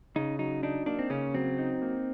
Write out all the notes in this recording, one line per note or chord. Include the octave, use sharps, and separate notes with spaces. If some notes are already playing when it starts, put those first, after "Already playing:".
C#3 D#4
F#3 D#4
D4 D#4
A#3 D4
C4
C#3 C#4
F#3 C4
D#4
A#3